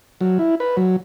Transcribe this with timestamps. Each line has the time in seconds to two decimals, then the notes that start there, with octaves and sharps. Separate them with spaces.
0.21 F#3
0.39 E4
0.60 B4
0.77 F#3